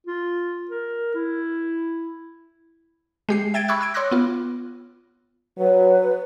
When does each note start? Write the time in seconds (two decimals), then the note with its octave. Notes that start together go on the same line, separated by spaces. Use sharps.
0.06 F4
0.70 A#4
1.14 E4
3.29 G#3 G4 C7
3.54 E5 G5 G#6 A6 D7
3.68 B5 C#6 D6 E6 F#6 G#6
3.81 E6 G#6 D7
3.94 C#5 C6 D6 E6 F#6 A#6
4.11 B3 F4
5.58 F#3 B4